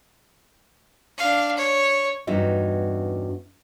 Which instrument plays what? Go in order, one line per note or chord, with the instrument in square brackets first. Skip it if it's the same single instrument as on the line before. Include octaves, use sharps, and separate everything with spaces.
[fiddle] D4 F5
C#5
[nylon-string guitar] E2 G2 C#4 D#4 F#4 E5